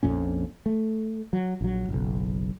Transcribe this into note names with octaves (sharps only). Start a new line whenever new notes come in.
A#1 F2 A#2 C#4
A3
F#3
A#1 F#3
F#1 B1